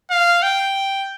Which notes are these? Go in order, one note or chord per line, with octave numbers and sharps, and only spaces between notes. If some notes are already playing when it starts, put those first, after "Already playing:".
F5
G5